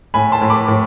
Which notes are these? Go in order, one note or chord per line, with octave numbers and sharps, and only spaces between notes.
A2 G#5 B5
A5 C6
A2
B5 D6
A2